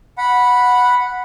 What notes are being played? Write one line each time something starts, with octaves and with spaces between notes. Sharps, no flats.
F#5 B5